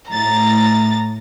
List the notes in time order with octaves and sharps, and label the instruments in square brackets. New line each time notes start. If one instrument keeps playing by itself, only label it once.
[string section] A2 A6 [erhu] A#5